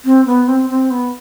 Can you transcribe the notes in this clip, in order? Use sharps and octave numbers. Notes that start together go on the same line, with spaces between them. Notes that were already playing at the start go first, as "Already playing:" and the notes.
C4
B3
C4
C4
B3